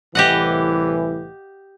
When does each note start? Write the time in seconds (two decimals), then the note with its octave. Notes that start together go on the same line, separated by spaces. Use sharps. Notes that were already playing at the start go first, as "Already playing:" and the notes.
0.15 C2 A2 E3 G4 D#5 F#5